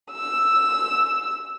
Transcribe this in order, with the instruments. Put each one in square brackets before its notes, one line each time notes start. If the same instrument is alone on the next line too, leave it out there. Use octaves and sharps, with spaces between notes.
[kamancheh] E6